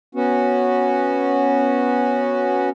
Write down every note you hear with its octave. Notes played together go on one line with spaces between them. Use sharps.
B3 C#4 F#4